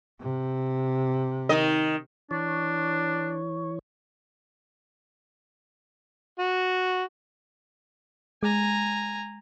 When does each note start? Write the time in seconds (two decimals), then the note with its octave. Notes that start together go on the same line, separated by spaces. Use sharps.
0.21 C3
1.49 D#3 D#5
2.31 E3 D4 C#5
6.39 F#4
8.43 G#3 G#5 A#5